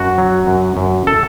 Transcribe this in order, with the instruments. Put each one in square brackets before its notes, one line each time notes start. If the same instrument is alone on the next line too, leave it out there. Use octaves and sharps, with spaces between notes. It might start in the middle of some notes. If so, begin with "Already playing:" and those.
Already playing: [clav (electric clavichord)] F#2 F#4
F#3
F#2
F#2
A4